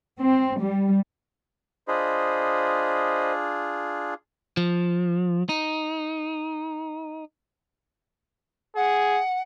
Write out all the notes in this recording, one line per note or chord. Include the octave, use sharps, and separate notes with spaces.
C4
G3
D4 F4 G#4 C5 D#5 B5
F3
D#4
G#4 F#5